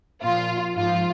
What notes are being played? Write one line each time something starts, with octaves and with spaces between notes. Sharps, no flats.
A#2 F3 F4
G#2 F3 F4